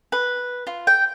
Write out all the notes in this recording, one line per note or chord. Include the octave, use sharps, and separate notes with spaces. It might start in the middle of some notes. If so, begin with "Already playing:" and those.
B4
F4
G5